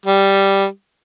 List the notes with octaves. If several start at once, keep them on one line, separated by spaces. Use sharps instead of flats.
G3